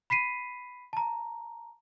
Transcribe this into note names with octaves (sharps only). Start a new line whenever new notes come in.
B5 B6 C7 D#7
A5 A#5